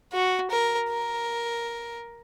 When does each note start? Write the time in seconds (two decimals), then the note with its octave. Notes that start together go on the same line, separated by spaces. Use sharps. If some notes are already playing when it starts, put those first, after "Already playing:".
0.13 F#4
0.51 A#4
0.89 A#4